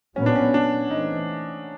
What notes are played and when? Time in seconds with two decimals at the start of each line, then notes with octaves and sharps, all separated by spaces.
0.16 A#2 F#3 B3 C#4
0.26 D4
0.36 C#4
0.54 D4
0.90 E3 A3 C4 D#4